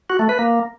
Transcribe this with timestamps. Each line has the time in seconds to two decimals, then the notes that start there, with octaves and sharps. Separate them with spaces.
0.10 F#4
0.19 A3
0.29 B4
0.39 A#3